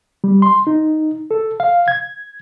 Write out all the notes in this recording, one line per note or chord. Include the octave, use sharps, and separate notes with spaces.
G3
C6
D#4
A4
F5
G#6